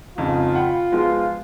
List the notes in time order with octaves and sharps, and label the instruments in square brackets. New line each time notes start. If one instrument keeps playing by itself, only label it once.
[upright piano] F2 G#2 C#3 [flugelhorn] F4
[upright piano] F#5 G5 B5
F3 G#3 B3